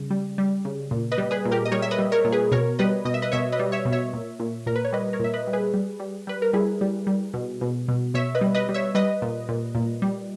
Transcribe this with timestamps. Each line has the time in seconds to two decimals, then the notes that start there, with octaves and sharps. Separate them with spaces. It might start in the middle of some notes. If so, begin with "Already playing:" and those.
Already playing: C#3 G3
0.10 G3
0.38 G3
0.65 C#3
0.91 A#2
1.12 B4 D#5
1.18 G3
1.31 G#4 B4
1.45 A#2
1.51 G4 A#4
1.65 D#5
1.72 G3 A#4 C#5
1.82 E5
1.91 B4 D#5
1.98 G3
2.12 A#4 C#5
2.25 A#2
2.32 G#4 B4
2.52 B2 A#4 C#5
2.79 G3 B4 D#5
3.05 B2 D#5
3.14 E5
3.22 B4 D#5
3.32 B2 C#5 E5
3.52 B4 D#5
3.59 G3
3.72 C#5 E5
3.85 B2
3.92 C#5 E5
4.13 A#2
4.39 A#2
4.66 A#2 A#4
4.76 B4
4.85 C#5
4.92 G3 B4 D#5
5.13 A#4 C#5
5.20 A#2 E5
5.33 B4 D#5
5.47 G3
5.53 G#4 B4
5.74 G3
6.00 G3
6.27 G3 B4
6.42 A#4
6.53 G3 E4 G#4
6.81 G3
7.07 G3
7.34 B2
7.61 B2
7.88 B2
8.14 B2 C#5 E5
8.35 B4 D#5
8.41 G3
8.55 B4 D#5
8.69 G3
8.74 C#5 E5
8.95 G3 B4 D#5
9.22 A#2
9.49 A#2
9.75 A#2
10.02 G3